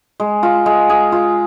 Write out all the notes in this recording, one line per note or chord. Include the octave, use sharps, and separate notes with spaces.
G#3
F4
G#3
G#4
F4